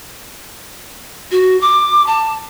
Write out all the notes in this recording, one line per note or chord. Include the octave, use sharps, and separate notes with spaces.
F#4
D6
A5